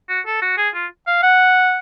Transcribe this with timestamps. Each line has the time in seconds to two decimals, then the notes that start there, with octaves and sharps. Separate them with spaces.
0.09 F#4
0.26 A4
0.42 F#4
0.58 G#4
0.75 F4
1.07 F5
1.23 F#5